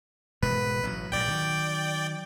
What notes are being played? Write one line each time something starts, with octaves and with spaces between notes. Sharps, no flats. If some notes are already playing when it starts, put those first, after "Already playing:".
E1 G#2 B2 B4
A1 F#3
A#1 G#2 D5 G5
D#3 F#3